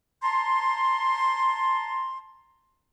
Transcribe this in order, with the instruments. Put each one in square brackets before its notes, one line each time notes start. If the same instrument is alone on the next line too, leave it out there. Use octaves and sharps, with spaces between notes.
[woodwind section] A5 A#5 C6